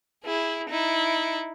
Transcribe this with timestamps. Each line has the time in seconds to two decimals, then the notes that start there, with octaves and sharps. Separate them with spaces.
0.24 E4 G#4
0.69 D#4 E4